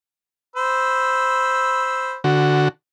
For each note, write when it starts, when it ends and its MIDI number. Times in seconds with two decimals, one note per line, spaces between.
0.56 2.17 72
0.56 2.17 83
0.56 2.17 88
2.24 2.68 50
2.24 2.68 66